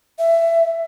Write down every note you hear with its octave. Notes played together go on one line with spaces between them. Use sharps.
E5